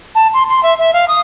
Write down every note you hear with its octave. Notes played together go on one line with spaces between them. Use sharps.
A5
C6
C6
E5
E5
F5
D#6